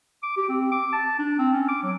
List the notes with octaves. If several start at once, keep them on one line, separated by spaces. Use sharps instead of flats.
D6
G4
C4
D6
A5
D4
C4
C#4
D6
F#3